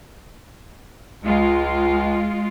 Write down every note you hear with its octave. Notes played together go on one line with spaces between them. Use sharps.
C#2 G#3 F4